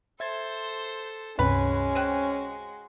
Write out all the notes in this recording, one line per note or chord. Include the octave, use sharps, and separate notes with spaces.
A4 C5 E5 G#6 A6
C#2 G2 C3 G#3 C#4 F#4 B4
C4 G5 F#6 D#7